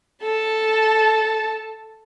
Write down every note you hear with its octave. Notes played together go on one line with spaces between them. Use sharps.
A4 A5